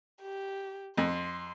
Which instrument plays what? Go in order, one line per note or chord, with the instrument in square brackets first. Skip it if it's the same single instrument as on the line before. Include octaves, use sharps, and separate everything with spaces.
[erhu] G4
[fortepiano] F2 [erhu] C6